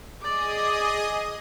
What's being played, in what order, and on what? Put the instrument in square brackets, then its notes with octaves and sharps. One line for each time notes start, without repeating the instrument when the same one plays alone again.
[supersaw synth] G#4 D#5 D#6 [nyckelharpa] D5 D6